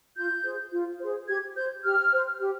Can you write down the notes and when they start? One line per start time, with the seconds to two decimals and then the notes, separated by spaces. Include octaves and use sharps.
0.16 F4 G6
0.44 G#4 C5
0.72 F4
1.00 G#4 C5
1.28 G4 G#6
1.56 C5 G6
1.85 G4 F6
2.13 C5
2.40 G4